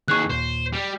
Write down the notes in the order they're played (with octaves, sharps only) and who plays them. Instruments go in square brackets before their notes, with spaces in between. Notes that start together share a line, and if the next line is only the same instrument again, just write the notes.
[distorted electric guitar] D#2 G#4 [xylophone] C#6 F#6
[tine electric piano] D#2 A#2 [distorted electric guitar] C5
[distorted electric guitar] G3